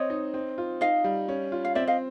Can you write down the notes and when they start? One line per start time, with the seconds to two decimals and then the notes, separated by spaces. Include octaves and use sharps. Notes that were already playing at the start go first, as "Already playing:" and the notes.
Already playing: C4 C#5 D#5
0.10 D#4
0.34 C4
0.58 F4
0.81 D#4 D#5 F5
1.04 G3
1.28 C#4
1.52 F4
1.65 F5
1.75 C4 D5 E5
1.87 D#5 F5